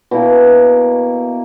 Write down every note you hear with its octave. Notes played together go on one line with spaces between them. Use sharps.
B2 A#3 E4 G4